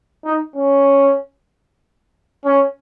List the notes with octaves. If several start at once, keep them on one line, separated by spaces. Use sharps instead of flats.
D#4
C#4
C#4